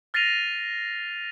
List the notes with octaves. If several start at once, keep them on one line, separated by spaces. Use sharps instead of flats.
F6 A6 A#6 C7 D#7 F7